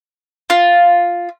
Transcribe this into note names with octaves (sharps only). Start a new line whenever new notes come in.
F4